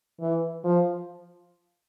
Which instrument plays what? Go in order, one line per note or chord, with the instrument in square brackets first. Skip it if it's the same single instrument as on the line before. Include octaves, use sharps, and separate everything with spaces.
[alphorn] E3
F3